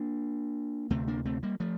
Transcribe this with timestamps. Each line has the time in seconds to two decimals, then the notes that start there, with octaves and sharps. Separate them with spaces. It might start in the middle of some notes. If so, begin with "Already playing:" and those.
Already playing: A#3 D4
0.90 D2 C3 A3 C4
1.08 A#3 D4
1.26 A3 C4
1.43 G3 A#3
1.60 F3 A3